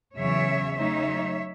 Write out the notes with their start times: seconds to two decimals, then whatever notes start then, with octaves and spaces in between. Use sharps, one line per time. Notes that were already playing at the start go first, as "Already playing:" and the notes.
0.16 E2 C#3 F#3 C#5 E5
0.75 C#3 F#3 A3 D#4 C#5 E5